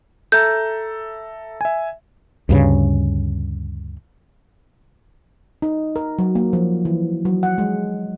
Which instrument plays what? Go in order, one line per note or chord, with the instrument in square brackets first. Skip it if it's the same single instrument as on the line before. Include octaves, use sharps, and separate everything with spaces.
[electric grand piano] A4 E5 A#5 [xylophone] G6
[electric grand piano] E5 G#5
[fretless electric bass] D2 G2 C#3
[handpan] D#4
A#4
F#3
A#3
F3
E3
F#3
F#5
G#3